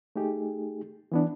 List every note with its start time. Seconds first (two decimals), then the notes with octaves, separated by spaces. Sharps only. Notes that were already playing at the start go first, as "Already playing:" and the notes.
0.16 A3 D#4 G4 G#4
1.12 E3 B3 D4